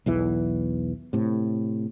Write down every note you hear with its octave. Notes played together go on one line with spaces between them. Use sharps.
B1 E2 E3
A2 C3